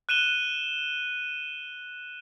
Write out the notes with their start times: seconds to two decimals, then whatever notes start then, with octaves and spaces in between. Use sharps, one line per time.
0.09 F#6 D#7 E7 G7